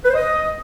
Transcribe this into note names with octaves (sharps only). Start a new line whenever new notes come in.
B4
C5
D#5